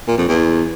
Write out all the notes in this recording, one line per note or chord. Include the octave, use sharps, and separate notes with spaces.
A#2
F2
E2